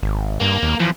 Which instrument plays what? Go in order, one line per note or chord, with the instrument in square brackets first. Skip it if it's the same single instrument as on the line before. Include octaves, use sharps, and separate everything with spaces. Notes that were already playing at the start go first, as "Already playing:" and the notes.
[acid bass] G#1
[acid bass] G2 [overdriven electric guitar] A#3
[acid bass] D#2
[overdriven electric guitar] E2 [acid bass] F3